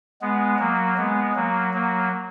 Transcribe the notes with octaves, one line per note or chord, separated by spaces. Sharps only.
G#3 B3
F#3 A#3
G#3 B3
F#3 A#3
F#3 A#3